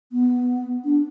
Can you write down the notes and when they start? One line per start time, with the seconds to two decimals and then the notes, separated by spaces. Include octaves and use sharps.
0.12 B3
0.85 D4